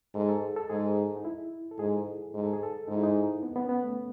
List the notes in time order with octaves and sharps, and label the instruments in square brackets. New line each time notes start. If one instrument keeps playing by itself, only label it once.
[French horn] G#2 [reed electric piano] A4
[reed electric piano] A4
G#4
A4
[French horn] G#2 [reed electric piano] G#4
[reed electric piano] D#4
E4
A4
[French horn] G#2 [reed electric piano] G#4
[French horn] G#2
[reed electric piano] A4
G#4
A4
[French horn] G#2 [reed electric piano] D#4
[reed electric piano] E4
D#4
B3
B3
C#4
B3
A3